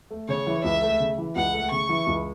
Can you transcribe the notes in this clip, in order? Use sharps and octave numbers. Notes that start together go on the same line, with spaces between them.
A3
C#3 C#5
E3
C#2 E5
A3
C#3
E3
C#2 F#5
A3
C#3 C#6
E3
C#2